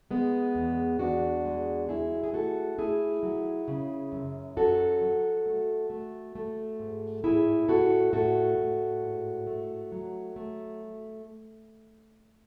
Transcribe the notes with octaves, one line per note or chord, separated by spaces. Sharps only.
G#3 B3
E2
E2 D4 F#4
G#3
F#3 E4 G#4
G#4
A3 F#4 A4
A3 E4 G#4
F#3
C#3
F#2
F#2 F#4 A4
F#3
A3
A3
A3
G#2
A2 E4 G#4
A2 F#4 A4
A2 F#4 A4
A2
G#2
A3
F#3
A3